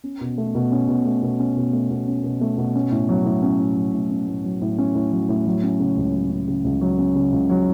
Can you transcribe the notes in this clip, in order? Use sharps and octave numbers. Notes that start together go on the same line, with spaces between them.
C#4
B2
A3
B2
C#4
B2
A3
B2
C#4
B2
A3
B2
C#4
B2
A3
B2
C#4
A2
F#3
A2
C#4
A2
F#3
A2
C#4
A2
F#3
A2
C#4
A2
F#3
A2
F#3
C#4
C#3
C#2
F#3
C#4
C#3
C#2
F#3
C#4
C#3
C#2
F#3